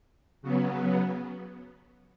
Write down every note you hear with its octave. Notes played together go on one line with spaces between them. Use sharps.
C#3 F#3 B3